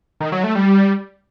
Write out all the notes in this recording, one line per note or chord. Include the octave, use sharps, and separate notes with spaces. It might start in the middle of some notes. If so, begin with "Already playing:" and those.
D#3
F#3
A3
G3